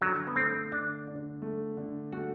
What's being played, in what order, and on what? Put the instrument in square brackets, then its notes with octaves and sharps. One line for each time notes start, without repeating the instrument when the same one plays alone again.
[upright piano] D3 [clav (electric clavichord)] F#3
[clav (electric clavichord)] B3
[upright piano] A3 [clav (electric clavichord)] C4
[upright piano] D3 [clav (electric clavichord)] D4
[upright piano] D3
A3
D3
[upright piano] A3 [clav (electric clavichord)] F#4